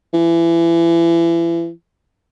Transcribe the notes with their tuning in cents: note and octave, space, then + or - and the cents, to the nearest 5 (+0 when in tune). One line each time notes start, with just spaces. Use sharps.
E3 +30